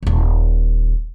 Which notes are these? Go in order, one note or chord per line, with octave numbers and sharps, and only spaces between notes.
D#1 G#1